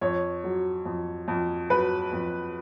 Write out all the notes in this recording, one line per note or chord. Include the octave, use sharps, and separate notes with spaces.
F2 C#5
F#3
F2
F2
F#3 B4
F2